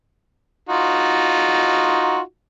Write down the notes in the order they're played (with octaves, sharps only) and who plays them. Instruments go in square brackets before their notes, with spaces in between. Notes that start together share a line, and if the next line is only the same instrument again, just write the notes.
[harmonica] D#4 F4 F#4